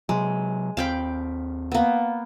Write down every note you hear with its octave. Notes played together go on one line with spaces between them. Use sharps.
C3 F#3 G#3
D#2 C4 F5 G5 B5
A#3 B3